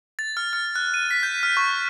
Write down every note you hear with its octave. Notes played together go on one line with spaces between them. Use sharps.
A6
F6
F6
F#6
D#7
B6
G6
F6
C#6